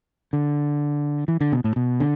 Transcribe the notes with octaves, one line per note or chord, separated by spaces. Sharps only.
D3
E3
D3
B2
A2
B2
D3